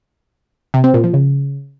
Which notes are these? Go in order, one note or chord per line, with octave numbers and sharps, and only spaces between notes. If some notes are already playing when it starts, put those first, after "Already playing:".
C3
C4
A#2
F3
C#3